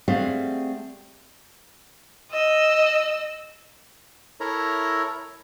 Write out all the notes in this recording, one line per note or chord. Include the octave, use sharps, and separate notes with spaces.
G3 A3 C4 G#4 F5 F#5
D#5 E6
E4 A4 A#4 C#5 E5 A#5